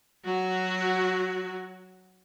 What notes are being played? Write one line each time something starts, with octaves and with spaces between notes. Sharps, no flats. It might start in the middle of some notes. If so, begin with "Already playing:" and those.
F#3 F#4